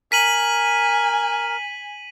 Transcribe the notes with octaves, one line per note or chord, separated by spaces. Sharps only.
A#4 G#5 B6 D#7 F#7